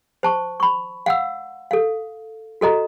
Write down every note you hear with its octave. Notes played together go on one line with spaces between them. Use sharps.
C5 A5 C#6
B5 C#6
F5 F#5 E6
A4 F5
F#4 A4 D#5 A#5